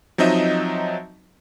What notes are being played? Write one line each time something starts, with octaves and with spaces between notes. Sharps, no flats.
F3 F#3 C4 D#4 D#5 E5